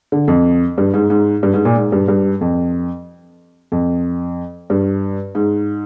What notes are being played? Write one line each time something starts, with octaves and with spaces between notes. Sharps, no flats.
D3
F2
G2
G#2
G#2
G2
G#2
A#2
G#2
G2
G2
F2
F2
G2
G#2